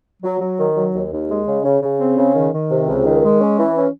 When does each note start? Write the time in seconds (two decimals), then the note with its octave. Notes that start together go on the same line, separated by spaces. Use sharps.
0.23 F#3
0.40 F#3
0.58 D#3
0.75 F#3
0.94 D#2
1.11 D#2
1.29 G#3
1.46 C#3
1.64 C#3
1.82 C#3
1.99 C4
2.17 C#3
2.34 D#3
2.52 D#3
2.70 C3
2.88 C#2
3.05 D#3
3.23 G#3
3.40 C#4
3.59 E3
3.76 C#4